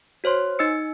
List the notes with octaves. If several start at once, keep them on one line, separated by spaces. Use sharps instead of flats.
F#4 C5 C#5 C6
D#4 D#5 E6 C#7